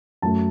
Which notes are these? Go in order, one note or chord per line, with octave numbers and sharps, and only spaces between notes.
F#2 F#3 A3 A5